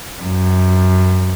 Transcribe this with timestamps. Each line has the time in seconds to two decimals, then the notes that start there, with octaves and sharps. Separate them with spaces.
0.23 F#2